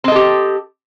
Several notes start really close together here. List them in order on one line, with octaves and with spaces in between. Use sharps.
C4 D#5 A4 G4